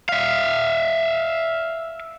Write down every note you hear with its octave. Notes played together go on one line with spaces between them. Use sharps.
E5 F5